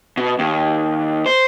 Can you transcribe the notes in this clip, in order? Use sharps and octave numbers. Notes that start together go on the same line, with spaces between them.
B2
D#2
C5